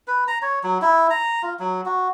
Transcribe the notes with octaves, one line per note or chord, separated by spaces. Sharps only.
B4
A#5
C#5
F#3
E4
A#5
F4
F#3
F#4